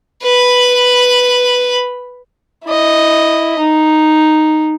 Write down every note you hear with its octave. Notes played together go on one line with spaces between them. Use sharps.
B4 B5
E4 D#5
D#4